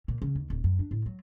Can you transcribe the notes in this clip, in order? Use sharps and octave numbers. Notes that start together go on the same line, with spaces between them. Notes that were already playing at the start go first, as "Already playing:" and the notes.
A#2
C#3
D#2
D#1
F#2
D4
A2
F#3